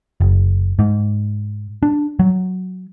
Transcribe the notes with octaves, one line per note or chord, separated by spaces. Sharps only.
F#1
G#2
D4
F#3